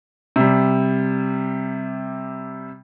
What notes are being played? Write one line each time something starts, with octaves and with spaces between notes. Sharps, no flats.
C3 G3